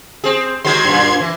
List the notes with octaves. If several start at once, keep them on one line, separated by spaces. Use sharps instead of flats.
C4 G#4
D#3 F#3 G#3 C6 G#6
F#2 A#2
E3